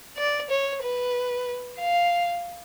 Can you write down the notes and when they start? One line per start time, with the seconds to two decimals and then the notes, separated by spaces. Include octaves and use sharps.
0.17 D5
0.50 C#5
0.82 B4
1.80 F5